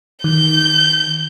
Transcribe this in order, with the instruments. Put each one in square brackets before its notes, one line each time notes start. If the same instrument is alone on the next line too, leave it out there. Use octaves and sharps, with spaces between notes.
[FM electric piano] D#3 [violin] G6